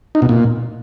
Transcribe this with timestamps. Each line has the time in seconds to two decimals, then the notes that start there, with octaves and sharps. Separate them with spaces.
0.15 D#4
0.22 B2
0.29 A#2